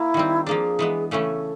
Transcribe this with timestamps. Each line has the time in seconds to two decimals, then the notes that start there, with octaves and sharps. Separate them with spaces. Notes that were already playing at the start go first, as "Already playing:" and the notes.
Already playing: A#3 E4
0.14 D#3 G3 C4
0.46 F3 A#3 D4 G#4
0.79 E3 G#3 B3
1.11 C#3 E3 A3 C#4 A4